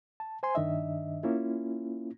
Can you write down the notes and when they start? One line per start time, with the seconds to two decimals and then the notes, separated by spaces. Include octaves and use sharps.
0.20 A5
0.43 C5 G#5 C6
0.55 G2 D#3 D4 D#5 E5
1.23 A#3 C#4 E4 F4